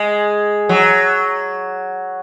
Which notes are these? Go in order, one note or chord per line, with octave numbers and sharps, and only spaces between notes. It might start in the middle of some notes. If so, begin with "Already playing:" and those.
Already playing: G#3
F#3